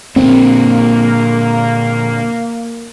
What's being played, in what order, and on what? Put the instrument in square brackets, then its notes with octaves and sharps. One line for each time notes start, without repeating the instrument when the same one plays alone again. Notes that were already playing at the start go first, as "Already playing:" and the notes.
[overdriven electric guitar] A#2 D3 [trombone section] A#3 [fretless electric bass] C4